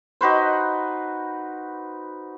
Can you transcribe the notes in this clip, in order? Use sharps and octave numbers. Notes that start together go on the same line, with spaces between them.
D#4 F#4 B4 C5